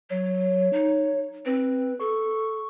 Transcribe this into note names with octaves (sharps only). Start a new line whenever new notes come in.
F#3 C#5
D#4
C4 B4
A4 C#6